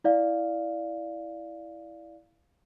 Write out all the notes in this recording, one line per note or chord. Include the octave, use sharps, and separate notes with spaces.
E4 D5 F5